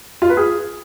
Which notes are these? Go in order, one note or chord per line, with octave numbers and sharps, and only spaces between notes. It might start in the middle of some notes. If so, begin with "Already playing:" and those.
F4
B4
G#4